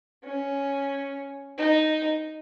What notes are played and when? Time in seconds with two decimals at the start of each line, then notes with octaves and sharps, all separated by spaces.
0.24 C#4
1.58 D#4